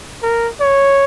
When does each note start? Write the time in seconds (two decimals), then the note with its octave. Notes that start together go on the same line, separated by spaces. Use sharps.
0.23 A#4
0.60 C#5